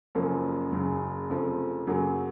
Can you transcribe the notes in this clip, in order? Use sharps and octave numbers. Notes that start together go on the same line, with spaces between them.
F#1 F#2 F3 A#3 C#4
F#1 F#2 C#3
F1 F2 C#3 F3 A3
F#2 C#3 F#3 A#3